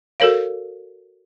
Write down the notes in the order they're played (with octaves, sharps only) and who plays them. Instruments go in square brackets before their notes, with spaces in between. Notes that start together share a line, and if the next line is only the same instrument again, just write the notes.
[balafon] F#4 A4 A#4 C#5 F5